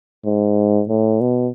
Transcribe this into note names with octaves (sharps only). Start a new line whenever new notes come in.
G#2
A2
B2